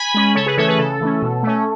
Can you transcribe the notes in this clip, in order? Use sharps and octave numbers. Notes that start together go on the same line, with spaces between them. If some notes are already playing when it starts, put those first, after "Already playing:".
Already playing: G#5 B5
G#3 C#4
C#3 A4 C#5
G#4 B4
E3 A3 C#4 A4 C#5
G#4 B4
C#3 A4
E3 A3 C#4
B2
A3 C#4